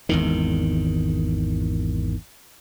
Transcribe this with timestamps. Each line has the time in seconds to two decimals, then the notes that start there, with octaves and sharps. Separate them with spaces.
0.09 G#1 E2 D#3